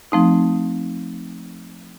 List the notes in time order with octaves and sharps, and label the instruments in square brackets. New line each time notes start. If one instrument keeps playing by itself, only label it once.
[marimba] F3 A3 C4 D#4